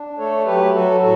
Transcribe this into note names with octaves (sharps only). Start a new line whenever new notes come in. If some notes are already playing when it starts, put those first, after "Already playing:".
Already playing: D4
A3 A4 C#5
F#3 G4 B4
F#3 F#4 A4
A2 F#4 A4